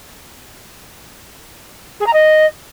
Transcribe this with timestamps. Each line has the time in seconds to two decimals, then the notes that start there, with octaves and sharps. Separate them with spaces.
2.00 G#4
2.07 A#5
2.13 D#5